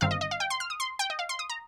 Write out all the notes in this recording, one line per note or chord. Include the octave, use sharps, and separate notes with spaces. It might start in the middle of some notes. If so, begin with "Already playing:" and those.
G1 G2 D#3 C4 F5
D#5
D#5
F5
G5
C6
F6
D#6
C6
G5
D#5
F5
C6
D#6
A#5